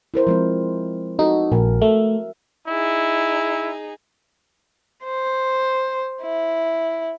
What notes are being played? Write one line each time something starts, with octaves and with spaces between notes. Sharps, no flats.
E4 A#4 C5
F3 G#3 C4
D#4 F#4 A4
A#1 A#4
A3 E5
D#4 E4 G#4
C5
E4